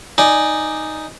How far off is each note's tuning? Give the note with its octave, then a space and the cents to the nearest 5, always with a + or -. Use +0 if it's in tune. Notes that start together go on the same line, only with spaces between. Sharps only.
D#4 +0 D5 +10 G#5 +0